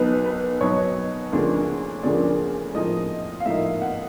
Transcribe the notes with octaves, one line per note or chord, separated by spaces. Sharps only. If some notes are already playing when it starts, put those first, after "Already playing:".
Already playing: B1 B2 F#3 B3 D#4 B4
B4
B1 B2 F#3 B3 D#4 C#5
D2 C#3 F3 A#3 D4
D2 C#3 F3 A#3 D4 D5
A2 F3 A#3 D#4 D#5
F5
A2 F3 A#3 D#4 E5
F#5